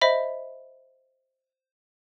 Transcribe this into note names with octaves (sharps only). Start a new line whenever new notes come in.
C5 D#5 E5 B5